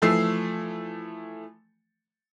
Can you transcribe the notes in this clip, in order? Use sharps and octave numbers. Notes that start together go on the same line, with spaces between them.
E3 F3 A3 E6 C7